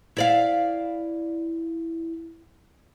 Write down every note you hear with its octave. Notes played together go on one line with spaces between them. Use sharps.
E4 D5 F5